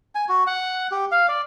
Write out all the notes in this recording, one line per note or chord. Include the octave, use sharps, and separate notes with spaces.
G#5
F#4
F#5
G4
F5
D5